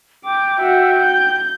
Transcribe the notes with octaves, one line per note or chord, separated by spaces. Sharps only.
G5 D6
F#4 E5
G6